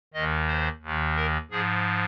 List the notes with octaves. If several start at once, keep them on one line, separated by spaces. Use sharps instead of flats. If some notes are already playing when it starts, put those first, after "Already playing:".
D#2 D#3 D#5
C5
D#2 D#3
A#4
G#2 F3 G#4